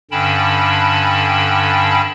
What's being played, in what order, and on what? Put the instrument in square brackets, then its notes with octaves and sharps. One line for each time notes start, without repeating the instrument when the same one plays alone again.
[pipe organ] G2 D3 C#4 G5 A5 B5